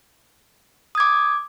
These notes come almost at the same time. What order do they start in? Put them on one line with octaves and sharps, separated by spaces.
D#6 G#6 D6